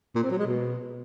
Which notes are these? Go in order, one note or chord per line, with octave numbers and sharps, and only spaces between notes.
A#2
C4
F#3
G#3
B2